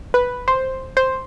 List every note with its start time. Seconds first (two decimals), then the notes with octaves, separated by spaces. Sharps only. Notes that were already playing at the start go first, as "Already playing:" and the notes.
0.14 B4
0.48 C5
0.97 C5